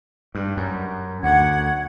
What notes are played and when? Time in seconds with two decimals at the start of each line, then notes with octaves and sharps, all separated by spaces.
0.35 G2
0.57 F#2
1.23 D2 F#5 G#6